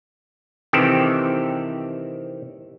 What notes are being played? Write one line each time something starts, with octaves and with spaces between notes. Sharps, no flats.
C3 D#3 E3 C4 G4 A4